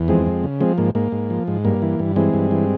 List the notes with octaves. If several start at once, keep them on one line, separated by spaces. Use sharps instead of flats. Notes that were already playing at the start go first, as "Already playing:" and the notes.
Already playing: E2
F2 G#3 C4
F2
C#3
F3 G#3 C4
G#2 A#3
G#2 A#3
G#2
F3
G#2
G2 A#3
E3
G2
E3 G#3 C4
G2
E3